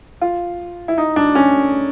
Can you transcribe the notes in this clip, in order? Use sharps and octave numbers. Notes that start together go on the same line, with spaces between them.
F4
E4
D#4
D4
C#4